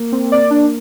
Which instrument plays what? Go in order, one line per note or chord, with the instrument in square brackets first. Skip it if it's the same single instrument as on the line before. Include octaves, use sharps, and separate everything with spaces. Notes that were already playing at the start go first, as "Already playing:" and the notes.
Already playing: [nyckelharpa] A#3
[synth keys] C4
D5
D4